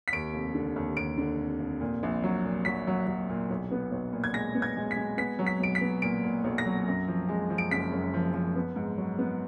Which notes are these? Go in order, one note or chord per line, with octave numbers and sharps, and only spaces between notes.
B6
D#2 D7
F1
D3
D#2
D#2 D7
D3
F1
F1
A#2
A#1
F#3
A#2
F#3 B6
F#3
F#3
A#2
B1
B3
B1
A#2
G#6
G#3 A#6
B3
G#6
G#3
B6
G#3
B3 B6
F#3
B6
B1 D7
B6
B3
A#2 D7
A#2
B1
A#6
F#3
F#2
F3
G#3
F3
D7
F#1 B6
F#2
F3
F3
B3
G#2
F#3
B3